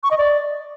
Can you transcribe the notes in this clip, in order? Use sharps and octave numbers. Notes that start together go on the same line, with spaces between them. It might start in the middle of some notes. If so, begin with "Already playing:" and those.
C#6
D#5
D5